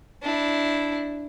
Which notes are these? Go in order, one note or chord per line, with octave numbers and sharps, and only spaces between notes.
D4 E4